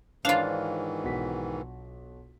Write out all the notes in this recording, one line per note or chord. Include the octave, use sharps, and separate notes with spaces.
G#2 D#3 E3 D4 F4 C5 C#5 F5
B1 F#4 B6